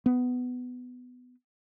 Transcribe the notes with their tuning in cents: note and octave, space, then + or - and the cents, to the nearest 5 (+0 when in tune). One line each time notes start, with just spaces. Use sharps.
B3 +15